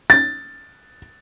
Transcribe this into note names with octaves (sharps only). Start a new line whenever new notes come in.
A6